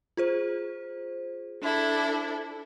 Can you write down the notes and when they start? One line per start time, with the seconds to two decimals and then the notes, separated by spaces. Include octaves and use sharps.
0.17 F4 G#4 C5
1.62 D4 E4 A4